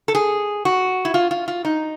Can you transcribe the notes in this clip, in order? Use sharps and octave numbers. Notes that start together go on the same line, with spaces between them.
A4
G#4
F#4
E4
F4
F4
F4
D#4